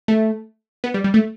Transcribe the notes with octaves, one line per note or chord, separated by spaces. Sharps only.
A3
B3
G3
G3
A3